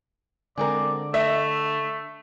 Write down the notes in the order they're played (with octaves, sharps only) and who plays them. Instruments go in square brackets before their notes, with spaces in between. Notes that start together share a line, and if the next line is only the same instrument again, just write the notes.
[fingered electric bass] D3 [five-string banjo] G#3 C4 A#4 [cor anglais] D5
[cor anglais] A3 [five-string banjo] D#5 [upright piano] E5